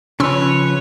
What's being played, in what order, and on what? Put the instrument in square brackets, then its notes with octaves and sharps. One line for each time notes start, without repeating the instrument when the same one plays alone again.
[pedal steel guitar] C#3 F3 B4 [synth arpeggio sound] C#4 C6 E6 [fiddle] C#5